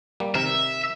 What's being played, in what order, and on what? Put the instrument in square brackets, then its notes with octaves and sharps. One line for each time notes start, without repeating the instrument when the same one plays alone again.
[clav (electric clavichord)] G3 A#3
[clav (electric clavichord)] C3 D#3 A#4 [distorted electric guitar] E5